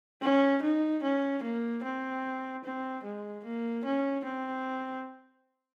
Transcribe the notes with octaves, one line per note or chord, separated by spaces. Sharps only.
C#4
D#4
C#4
A#3
C4
C4
G#3
A#3
C#4
C4